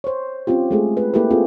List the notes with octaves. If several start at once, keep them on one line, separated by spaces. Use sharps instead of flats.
C5 C#5
C4 C#4 F4 G4
G#3 A3 G#4
B4
A#3 E4 G4 A4 B4
C4 F4 G#4 A4